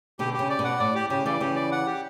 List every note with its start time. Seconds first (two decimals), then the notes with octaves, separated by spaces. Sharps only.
0.19 B2 D3 G4
0.33 G4
0.39 C#3
0.49 D5
0.59 B2
0.64 F#5
0.79 A2 D5
0.95 G4
1.10 C#3 G4
1.26 C#3 E3 D5
1.41 C#3 E3 G4
1.55 D5
1.72 F#5
1.86 G4